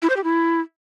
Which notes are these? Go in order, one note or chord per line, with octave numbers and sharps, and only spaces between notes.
E4
C5
G4
E4